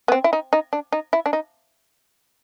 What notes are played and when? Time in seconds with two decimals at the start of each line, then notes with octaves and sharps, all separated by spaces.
0.08 B3
0.12 C4
0.24 E4
0.33 D#4
0.53 D#4
0.73 D4
0.92 D#4
1.13 E4
1.26 D4
1.33 D#4